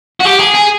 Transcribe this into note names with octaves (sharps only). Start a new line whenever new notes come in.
F#4
G4
G#4
G#4